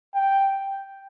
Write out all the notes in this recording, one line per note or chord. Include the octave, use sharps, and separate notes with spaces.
G5